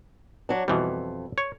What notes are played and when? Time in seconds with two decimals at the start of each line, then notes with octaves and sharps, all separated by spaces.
0.49 F#3 D4
0.68 F2 B2 E3 G3
1.38 C#5